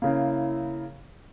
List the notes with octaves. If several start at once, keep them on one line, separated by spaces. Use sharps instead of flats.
C#3 A#3 E4